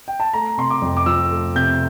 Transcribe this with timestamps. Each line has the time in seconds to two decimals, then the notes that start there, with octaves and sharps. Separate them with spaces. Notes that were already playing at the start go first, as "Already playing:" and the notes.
0.08 G5
0.20 A5
0.34 A3 A#5
0.57 C3 C6
0.70 D6
0.82 F2
0.97 D6
1.06 F3 E6
1.31 A3
1.55 C3 G6